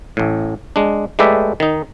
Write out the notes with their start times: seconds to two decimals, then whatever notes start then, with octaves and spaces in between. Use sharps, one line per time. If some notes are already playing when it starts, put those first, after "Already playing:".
0.17 A1 A2
0.76 G#3 D4
1.19 G#3 A3 G4 B4 D5 E5
1.60 D#3 D#4